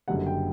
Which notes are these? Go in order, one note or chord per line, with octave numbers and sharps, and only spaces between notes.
F#1 F#2 D3 G3 F#5
G5